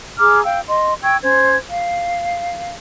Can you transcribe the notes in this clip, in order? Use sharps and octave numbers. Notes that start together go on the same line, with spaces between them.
G#4 A#5 D6 F6
F5 G5 E6
D#5 C6
G5 C#6 E6 G#6
C#4 C5 G#6
F5